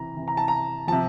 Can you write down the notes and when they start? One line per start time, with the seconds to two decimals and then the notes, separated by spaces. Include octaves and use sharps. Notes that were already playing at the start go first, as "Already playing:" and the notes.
Already playing: C3 E3 A#5
0.17 C3 E3
0.28 A#5
0.37 A5
0.48 A#5
0.87 C3 F3 A5